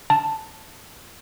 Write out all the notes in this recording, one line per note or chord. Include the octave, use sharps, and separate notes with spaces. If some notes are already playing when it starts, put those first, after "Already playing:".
A5